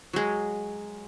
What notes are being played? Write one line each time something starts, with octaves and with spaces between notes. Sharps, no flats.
F#3 G#3